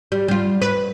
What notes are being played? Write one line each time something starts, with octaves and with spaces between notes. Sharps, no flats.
G3
G3 F4
B4